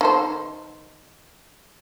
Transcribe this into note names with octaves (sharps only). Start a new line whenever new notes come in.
D#3 A4 C5